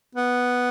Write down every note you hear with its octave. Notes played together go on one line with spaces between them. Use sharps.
B3